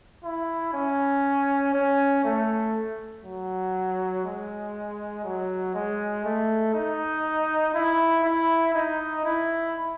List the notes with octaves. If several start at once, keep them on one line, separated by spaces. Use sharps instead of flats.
E4
C#4
C#4
A3
F#3
G#3
F#3
G#3
A3
D#4
E4
E4
D#4
E4